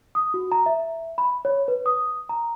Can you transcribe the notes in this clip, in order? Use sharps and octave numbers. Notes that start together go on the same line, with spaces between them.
D#6
F#4
A#5
E5
B5
C#5
B4
D#6
A#5